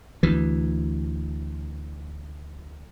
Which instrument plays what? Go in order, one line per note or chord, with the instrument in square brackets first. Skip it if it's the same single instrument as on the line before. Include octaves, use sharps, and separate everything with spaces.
[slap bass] D2 E3